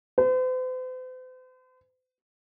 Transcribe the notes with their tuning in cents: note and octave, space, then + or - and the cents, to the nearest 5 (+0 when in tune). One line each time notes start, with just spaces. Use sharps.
C5 -45